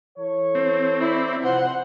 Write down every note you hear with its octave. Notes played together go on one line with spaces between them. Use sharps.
E3 A4 C#5
C4
E4 D5
C3 F3 C5 F#5